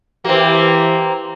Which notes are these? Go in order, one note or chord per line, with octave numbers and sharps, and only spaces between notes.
E3 A#3 C4 G4